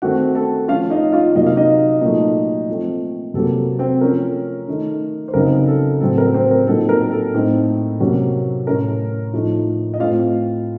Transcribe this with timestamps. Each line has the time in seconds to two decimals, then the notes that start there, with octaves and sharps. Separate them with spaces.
0.02 D#3 A3 C4 F#4 F#5
0.35 A4 A5
0.68 F3 A3 C#4 F4 F5
0.90 D#4 D#5
1.12 F4 F5
1.35 C3 F#3 A#3 D#4 D#5
1.46 F5
1.56 D#4 D#5
2.01 A#2 F#3 A3 D#4 D#5
2.69 F3 A3 C4
3.34 C3 F#3 A#3 A4
3.79 C4 C5
4.01 F3 A3 C#4 A#4
4.68 D#3 A3 D#4
5.28 C5
5.34 C#3 F#3 C4 D#4 A#4
5.68 A4
6.01 A2 F#3 C4 A4
6.18 A#4
6.34 C4 C5
6.51 A#4
6.67 A#2 F#3 C4 D#4 A4
6.89 A#4
7.12 A4
7.34 A2 A3 C4 D#4
8.00 C3 F#3 A#3 C#4
8.67 A2 A3 C#4 A#4
9.33 A2 F3 A3 D#4
9.94 D#5
10.00 A2 A3 C4 F4 F5